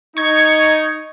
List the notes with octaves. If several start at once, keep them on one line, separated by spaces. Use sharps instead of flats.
D#4 C#6 G#6